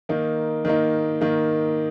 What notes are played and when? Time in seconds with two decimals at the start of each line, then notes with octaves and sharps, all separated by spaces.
0.09 D#3 A#3 D#4
0.65 D#3 A#3 D#4
1.21 D#3 A#3 D#4